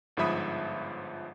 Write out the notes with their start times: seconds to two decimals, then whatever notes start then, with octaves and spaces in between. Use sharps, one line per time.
0.17 G1 G#2 F3 E5 B5 D#6